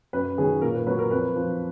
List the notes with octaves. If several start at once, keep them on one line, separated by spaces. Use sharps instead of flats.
F#2 B4
D#3 F#3 G#4
A#2 A#4
B4
F#3 B4
A#4
F2 B4
F3